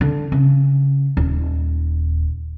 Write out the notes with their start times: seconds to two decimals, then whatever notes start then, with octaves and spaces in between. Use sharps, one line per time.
0.01 D3
0.32 C#3
1.17 D#1